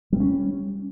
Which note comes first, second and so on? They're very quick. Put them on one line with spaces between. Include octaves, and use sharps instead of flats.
G3 B3 C#4